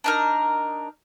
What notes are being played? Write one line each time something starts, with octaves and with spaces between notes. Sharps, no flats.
D4 D#4 A#4